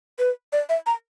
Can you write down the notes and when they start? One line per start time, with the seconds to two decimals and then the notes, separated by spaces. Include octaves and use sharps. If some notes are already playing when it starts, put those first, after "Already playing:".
0.19 B4
0.53 D5
0.69 E5
0.86 A#5